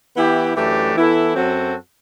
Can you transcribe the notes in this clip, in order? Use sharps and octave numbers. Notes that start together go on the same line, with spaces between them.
E3 B3 E4 G4
F#2 E3 A3 D4 G4
E3 B3 E4 A4
F#2 F#3 C4 F#4 A4